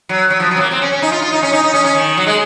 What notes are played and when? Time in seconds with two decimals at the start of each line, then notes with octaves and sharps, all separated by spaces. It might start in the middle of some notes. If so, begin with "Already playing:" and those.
0.09 F#3
0.30 F#3
0.40 F3
0.51 F#3
0.57 C4
0.60 A#3
0.71 C4
0.82 C#4
0.92 C#4
1.02 D#4
1.12 F4
1.22 F4
1.32 D#4
1.43 C#4
1.53 D#4
1.64 D#4
1.74 C#4
1.85 C#4
1.95 D#3
2.18 F#3
2.27 G#3